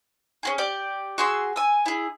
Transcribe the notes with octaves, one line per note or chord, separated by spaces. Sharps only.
C#4 F#4 G#4
G4 D5
F#4 G#4 C6 E6
G#5 E6
E4 G#4